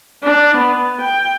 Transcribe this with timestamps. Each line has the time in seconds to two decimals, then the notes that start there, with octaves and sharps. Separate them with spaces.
0.24 D4
0.57 B3
1.01 G5